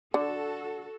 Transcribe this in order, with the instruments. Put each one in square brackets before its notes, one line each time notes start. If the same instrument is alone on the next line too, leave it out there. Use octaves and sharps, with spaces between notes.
[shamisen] D3 [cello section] F#4 A4